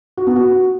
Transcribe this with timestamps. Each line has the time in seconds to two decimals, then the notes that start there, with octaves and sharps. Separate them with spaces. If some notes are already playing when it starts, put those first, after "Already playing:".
0.17 F#4
0.27 B3
0.36 F#4